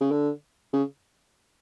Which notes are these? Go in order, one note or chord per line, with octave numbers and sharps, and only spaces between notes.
C#3
D3
C#3